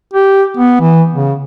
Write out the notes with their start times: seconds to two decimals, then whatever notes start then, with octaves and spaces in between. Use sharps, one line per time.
0.13 G4
0.57 B3
0.81 E3
1.13 C#3